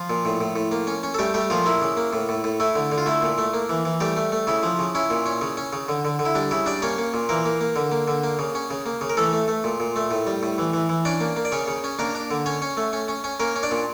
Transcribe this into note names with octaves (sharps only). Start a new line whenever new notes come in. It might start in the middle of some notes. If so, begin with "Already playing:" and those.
Already playing: F3 F4
A#2
A2
A2
A2
A#3
C#4
C#4
A4
G3 A3 G4
G3 A3 G4
A#2 F3 F4
A#3 E4
C#3
A#3
A2
A2
A2
A3 E4
D3
D3
F4
A3 E4
A#2
A3
A#3
E3
E3
G3 A3 G4
A3
A3
C#3 E4
F3
C#3
C#4 E4
A#2
C#4
C#3
C#4
C#3
D3
D3
D3
E4
G3 D4
C#3 E4
G3 D4 D5
A#3 C#4 C#5
A#3
A#2
E3 A#3 A#4
A#3
A#3
D3
A#3
D3
A#3
C#3
C#4
C#3
A#3
C#3
A#4
E3 A3 A4
A3
A3
A#2
A#2
A3
A2
G3
A2
E3
E3
E3
C#4 D4 D5
A#3
A#3
D5
C#3 C#4 C#5
C#3
C#4
A#3 D4 A#4
D4
D3
C#4 C#5
C#4
A3
C#4
C#4
C#4
A#3 C#4 A#4
C#4
D4 D5
A#2